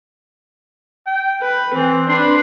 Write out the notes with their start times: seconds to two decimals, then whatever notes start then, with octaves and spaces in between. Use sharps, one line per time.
1.07 G5
1.42 B4
1.74 E3 C4
2.09 D4 B4 C6